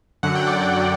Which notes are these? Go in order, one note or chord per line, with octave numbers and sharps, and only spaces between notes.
F#2 D3 F#3 F#5
G5
D5 F#5
D3 F#3